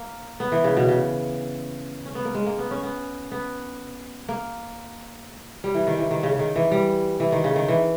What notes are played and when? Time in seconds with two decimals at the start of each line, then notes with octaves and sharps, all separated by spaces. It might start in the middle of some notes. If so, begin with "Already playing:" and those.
Already playing: A#3
0.40 B3
0.52 E3
0.64 C#3
0.77 B2
0.89 C#3
2.06 C#4
2.15 B3
2.25 A#3
2.35 G#3
2.46 A#3
2.59 B3
2.71 C#4
2.83 B3
3.32 B3
4.29 A#3
5.64 G3
5.74 E3
5.87 D#3
5.98 E3
6.11 D#3
6.23 C#3
6.34 C#3
6.39 D#3
6.56 E3
6.72 G3
7.20 E3
7.32 D#3
7.44 C#3
7.56 D#3
7.68 E3